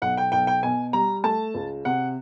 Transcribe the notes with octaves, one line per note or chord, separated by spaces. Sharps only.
B1 F#5
G5
B1 G5
G5
B2 G#5
G3 A#5
A3 A5
C#2
C3 F#5